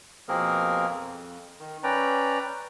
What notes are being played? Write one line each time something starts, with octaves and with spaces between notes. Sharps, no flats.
B2 F3 A#3 C4 G#4 A#4
F2
D#3
C#4 B4 D5 G5 A#5